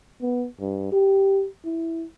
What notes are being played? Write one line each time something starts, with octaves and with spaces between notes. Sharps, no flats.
B3
G2
G4
E4